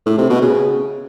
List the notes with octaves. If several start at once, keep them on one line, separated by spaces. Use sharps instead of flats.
A2
C3
B2
C#3